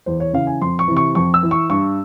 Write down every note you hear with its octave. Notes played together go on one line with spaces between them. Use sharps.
E2 C5
C#5
C#3 E3 F5
G#5
F2 C6
C#6
C3 E3
C#6
F2 C#6
E6
E3
C#6
G2 C#6